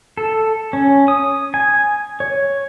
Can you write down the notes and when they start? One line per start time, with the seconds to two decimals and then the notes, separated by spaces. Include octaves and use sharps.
0.17 A4
0.73 C#4
1.08 D#6
1.54 G#5
2.20 C#5